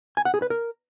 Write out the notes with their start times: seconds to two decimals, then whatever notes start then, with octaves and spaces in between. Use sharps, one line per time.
0.17 G#5
0.25 F#5
0.34 G#4
0.42 B4
0.50 A#4